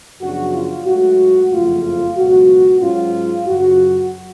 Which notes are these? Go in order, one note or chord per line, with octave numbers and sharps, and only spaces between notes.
F#2 C#3 F3 B3 D4 F#4
F4
G#2 F#3 A3 F4 F#4
F#1 F2 C#3 F3 A3 F4
C#2 B2 F#3 B3 F#4
G#2 F#3 C#4 F4
F#2 C#3 F#3 F#4